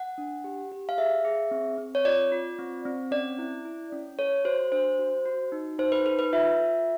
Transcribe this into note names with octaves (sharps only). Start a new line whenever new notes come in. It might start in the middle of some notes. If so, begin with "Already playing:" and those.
Already playing: F#5
D4
G4
G4
F5
G#4 E5
G#4
C4
C4
C#5
F4 D5
F4
C4
C4
C#4 D5
E4
E4
C#4
A4 C#5
F#4 C5
D4 C5
F#4
F#4
D#4
D#4 C5
B4
A4 B4
B4
F4 E5
A4